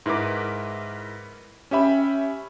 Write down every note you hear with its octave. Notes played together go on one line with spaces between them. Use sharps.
G#2 E4 A#4 B4 D6
C#4 G4 E5 B5